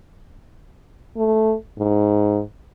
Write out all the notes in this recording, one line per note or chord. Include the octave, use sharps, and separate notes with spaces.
A3
G#2